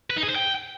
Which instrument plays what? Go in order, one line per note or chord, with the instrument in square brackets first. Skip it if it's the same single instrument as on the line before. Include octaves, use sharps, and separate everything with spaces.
[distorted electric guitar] B4
D#4
G#4
C5
G5